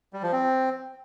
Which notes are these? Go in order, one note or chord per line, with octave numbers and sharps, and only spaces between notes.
G3
F3
C4